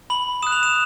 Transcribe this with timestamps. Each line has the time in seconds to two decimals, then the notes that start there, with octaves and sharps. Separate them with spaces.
0.10 B5 F#7
0.42 D#6 F#6 E7
0.52 F7
0.63 E7